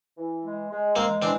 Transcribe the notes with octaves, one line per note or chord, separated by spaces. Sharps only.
E3
G#3
G#3
G#3 A#3 C4
E3 C4 D4